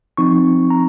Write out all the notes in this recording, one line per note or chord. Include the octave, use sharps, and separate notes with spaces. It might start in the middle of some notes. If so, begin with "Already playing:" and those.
F3 C4 D#4 C#6
A#5